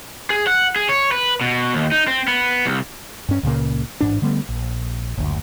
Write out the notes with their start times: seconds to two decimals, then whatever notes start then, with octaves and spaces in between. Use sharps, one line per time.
0.30 G#4
0.47 F#5
0.76 G#4
0.89 C#5
1.12 B4
1.41 B2
1.73 D#2
1.92 D#4
2.07 C4
2.28 B3
2.66 C2
3.29 G2 C#4
3.43 C#2 A#2 C#3 A#3
4.01 A1 G#2 D4
4.22 D3 G3 A3 B3
4.49 A#1
5.17 F#1 D2